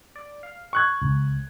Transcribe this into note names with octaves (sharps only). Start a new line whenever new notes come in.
D5
F5
C#6 F#6 G#6
C#2